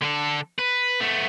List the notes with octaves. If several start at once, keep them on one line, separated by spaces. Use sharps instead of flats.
D3 A4
B4
A3 B3